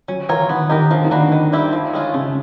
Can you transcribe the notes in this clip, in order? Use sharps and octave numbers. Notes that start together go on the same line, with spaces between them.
F#3 C#4
E3 F4 A#4 C#5
D#3 B3
D#3 D#4 G4 A#4
D3 F3
D#3
A#3 D4 F#4 B4
D3
D#3
G3 C4 E4 G4
F3
G#3 C#4 F4
C#3 A3